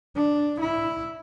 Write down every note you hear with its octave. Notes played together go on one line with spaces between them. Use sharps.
D4
E4